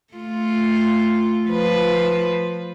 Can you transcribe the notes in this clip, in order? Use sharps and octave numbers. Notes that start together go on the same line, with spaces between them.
A3 F4
F3 B4